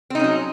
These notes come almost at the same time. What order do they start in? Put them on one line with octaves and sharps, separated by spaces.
C4 D#4 C#4 F#3